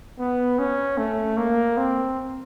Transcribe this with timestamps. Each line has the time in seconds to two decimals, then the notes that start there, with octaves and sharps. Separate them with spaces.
0.19 B3
0.58 C#4
0.98 A3
1.37 A#3
1.77 C4